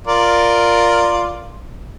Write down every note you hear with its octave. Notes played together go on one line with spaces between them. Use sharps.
F4 A#4 D5